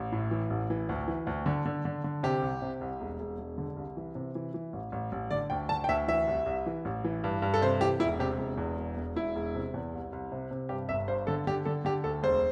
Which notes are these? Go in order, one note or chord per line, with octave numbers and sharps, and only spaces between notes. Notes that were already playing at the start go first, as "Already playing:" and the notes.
Already playing: A1
A2
E3
A1
E3
D2
E3
D2
D3
D3
D3
D3
C3 G4
C2
C3
C2
E1
E1
E1
D3
C2
E3
C3
E3
E3
A1
A1
A1
D3 D5
D2 G5
D3 A5
G5
D2 E5
E3 E5
C2
C2
E3
A1
E3
G2
G2
A4
C3 C5
E3 G4
E1 E4
C3 G4
E1
E2
E1
E1
E1 E4
E1
C3
E2
C2
C2
C3
C3
G2 G4
G1 E5
G2 C5
D3 A4
D3 G4
D3 A4
D3 G4
D2 A4
E1 C5